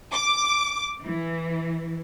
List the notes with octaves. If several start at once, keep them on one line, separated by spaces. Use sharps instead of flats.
D6
E3